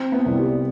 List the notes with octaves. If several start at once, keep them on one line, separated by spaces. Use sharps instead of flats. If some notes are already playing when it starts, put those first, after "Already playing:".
Already playing: C4
B3
C2
G3